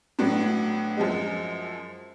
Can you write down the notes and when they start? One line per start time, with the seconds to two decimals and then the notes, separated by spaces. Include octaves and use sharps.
0.19 A2 F#3 B3 D4
0.97 F#2 F3 G#3